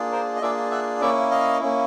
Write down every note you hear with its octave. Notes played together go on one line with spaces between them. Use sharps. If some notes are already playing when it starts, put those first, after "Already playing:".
Already playing: A#3 D4 F4 G#4
A#4 C5
D#5
A#3 D4 F4 G#4 D5 E5
E5 F#5
A#3 C#4 E4 D5 E5
D#5 F5
A#3 C#4 E4